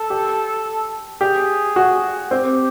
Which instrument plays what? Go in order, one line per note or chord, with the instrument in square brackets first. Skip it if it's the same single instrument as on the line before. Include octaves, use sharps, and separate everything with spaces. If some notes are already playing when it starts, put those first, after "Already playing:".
Already playing: [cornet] A4
[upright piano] G4
[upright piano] G4 [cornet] G#4
[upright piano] F#4
[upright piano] C4 [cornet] G4